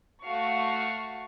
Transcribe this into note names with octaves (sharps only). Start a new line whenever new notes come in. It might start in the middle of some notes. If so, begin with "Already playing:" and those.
A3 F#4 F5 C#6